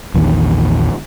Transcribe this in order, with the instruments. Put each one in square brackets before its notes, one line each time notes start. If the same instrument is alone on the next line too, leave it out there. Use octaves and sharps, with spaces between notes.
[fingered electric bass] A#1 E2 A#2 D#3